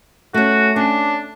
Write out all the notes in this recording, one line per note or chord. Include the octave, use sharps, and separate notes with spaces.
A3 C#4 F#4
C#4 D4